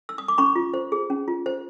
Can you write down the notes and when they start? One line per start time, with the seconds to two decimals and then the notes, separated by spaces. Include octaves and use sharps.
0.09 E6
0.18 D#6
0.28 D6
0.38 C#4 B5 C#6
0.55 F4
0.74 C5
0.92 G#4
1.10 C#4
1.28 F4
1.46 C5